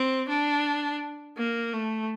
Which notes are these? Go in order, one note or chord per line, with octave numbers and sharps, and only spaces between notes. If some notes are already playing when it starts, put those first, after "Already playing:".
Already playing: C4
D4
A#3
A3